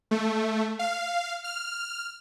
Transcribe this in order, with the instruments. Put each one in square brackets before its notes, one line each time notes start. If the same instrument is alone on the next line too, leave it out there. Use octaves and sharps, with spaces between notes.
[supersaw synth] A3
F5
F6